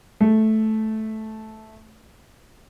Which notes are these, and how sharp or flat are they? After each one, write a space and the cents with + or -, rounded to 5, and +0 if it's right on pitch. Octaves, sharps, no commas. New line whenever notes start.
A3 -10